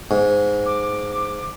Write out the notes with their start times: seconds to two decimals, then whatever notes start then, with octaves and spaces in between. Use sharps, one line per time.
0.11 G#2
0.66 D6